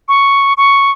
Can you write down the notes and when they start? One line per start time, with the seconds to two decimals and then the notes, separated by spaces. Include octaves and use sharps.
0.09 C#6
0.57 C#6